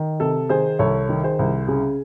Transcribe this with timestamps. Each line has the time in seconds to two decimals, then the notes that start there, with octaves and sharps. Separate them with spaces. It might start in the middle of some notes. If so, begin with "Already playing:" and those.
Already playing: D#3
0.20 C3 A4
0.49 D#3 G#4 C5
0.79 C2 A4 C#5
1.09 D#3
1.23 G#4 C5
1.39 C2
1.68 C#3 G#4